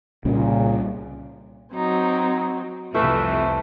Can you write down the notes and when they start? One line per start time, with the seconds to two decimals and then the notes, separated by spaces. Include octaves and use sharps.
0.25 C2 A#2 C#3 G3 C#4
1.75 F#3 C4 D#4
2.94 C2 F2 C3 E3 A3 F4 B4 E5